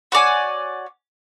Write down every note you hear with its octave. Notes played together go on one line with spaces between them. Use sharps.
F#4 C#5 D5 G#5